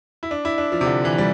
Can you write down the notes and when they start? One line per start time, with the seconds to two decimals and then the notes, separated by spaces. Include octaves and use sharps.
0.23 E4
0.31 D4
0.45 E4
0.58 D4
0.72 F3
0.81 C3
0.86 D3
1.05 E3
1.18 G3